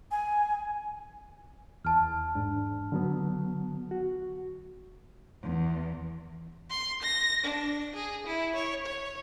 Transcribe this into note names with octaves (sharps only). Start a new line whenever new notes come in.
G#5
E2 A5 F6
G#2 D4
D3 F#3 B3
F#4
E2
C6
A#6
D4
G#4
E4
C#5
C#5